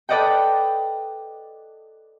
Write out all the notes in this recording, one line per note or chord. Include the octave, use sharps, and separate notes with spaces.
A4 B4 D5 D#5 F#5 G5